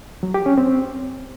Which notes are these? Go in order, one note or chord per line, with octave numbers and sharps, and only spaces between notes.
F#3
G4
C#4
C4